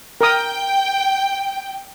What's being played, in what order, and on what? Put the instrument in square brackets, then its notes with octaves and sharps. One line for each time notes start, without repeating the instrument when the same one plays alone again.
[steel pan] A#4 D#6 [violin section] G5